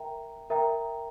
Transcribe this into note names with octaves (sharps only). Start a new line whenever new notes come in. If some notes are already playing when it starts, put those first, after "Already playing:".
Already playing: A#4 E5 G5 A#5
A#4 E5 G5 A#5